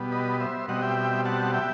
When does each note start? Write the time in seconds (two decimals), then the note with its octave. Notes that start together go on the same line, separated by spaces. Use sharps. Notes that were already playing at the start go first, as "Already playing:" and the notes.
Already playing: B2 G3 B3
0.12 B4 D#5
0.40 C5 E5
0.68 B2 G3 C4 D#5 F#5
0.82 E5 G5
1.25 F#5 A5
1.54 E5 G5